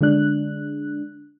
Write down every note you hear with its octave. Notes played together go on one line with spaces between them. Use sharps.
D3 G#3 D4 F#6